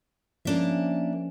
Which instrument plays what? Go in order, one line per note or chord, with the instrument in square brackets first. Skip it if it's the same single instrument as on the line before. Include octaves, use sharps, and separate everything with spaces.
[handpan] F3 C#4 [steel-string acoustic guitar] A#3 D4 E5